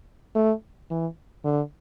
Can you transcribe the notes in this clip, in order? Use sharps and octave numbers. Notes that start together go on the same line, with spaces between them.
A3
E3
D3